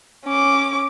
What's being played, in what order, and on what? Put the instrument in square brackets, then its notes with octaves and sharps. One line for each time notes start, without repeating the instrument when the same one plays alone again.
[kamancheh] C#4 D6